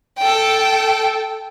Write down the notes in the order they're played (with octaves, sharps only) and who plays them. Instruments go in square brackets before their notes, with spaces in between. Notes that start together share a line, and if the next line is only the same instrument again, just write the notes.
[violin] A4 G5